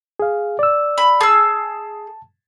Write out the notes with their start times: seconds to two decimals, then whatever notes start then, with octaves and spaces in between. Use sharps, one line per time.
0.19 G#4 F5
0.59 D5 E6
0.98 B5
1.21 G#4 A5 E6